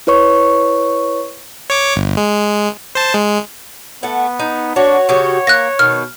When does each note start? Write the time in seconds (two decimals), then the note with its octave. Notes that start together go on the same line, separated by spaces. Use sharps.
0.07 E4 B4 C#5 C#6
1.70 C#5 D6
1.96 G1
2.17 G#3
2.95 C5 A5
3.14 G#3
4.03 A3 B3 F#5
4.39 D#4
4.76 D4 F#4 C#5
5.09 C#3 F#4 G4 C#5
5.47 A#3 F#6 A#6
5.79 B2 D#3 F6